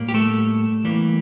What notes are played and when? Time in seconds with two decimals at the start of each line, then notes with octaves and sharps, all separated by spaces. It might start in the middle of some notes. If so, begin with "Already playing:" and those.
Already playing: A2 G3 A#3
0.08 G4
0.14 A3 A4
0.84 E2 E3 G3 A#3